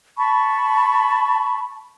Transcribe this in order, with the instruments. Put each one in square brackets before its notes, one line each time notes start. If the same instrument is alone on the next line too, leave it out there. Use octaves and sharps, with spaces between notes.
[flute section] A5 B5 C#6